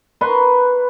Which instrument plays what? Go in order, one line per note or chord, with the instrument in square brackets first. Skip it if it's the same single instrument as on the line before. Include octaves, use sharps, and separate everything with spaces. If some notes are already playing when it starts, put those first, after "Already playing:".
[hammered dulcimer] B4 A#5 C6 C#6